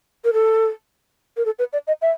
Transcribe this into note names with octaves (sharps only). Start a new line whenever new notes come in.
A#4
A4
A#4
A4
B4
D5
D#5
E5